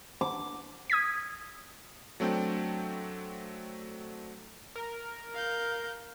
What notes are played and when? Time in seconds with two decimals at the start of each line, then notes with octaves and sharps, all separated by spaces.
0.21 D6
0.90 D#6 G#6 B6
2.20 F#3 A3 C4 D4 G5
4.75 A#4
5.35 F5 G6